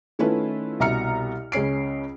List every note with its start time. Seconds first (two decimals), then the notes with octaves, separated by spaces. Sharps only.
0.19 D#3 A3 C#4 E4 F4 B4
0.80 C2 B2 E5 A#5 F6 C#7
1.52 C#2 C#3 C#4 C7 D7